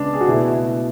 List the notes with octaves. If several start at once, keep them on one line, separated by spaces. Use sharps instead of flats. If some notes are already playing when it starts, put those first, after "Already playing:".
Already playing: C#3 G#3 B3 D4
G#4
F#4
B2 A3 E4